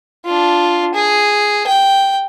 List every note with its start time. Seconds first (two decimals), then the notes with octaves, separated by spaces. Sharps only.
0.25 D4 F4
0.94 G#4
1.67 G5